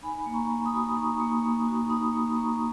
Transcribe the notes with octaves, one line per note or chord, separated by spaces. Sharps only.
D#4 G#5 B5
A#3
A#5 C#6
A#3
B5 D#6
F#4
D#4 A#5 C#6
A#3
A#3
F#4
D#4 B5 D#6
A#3
A#3 A#5 C#6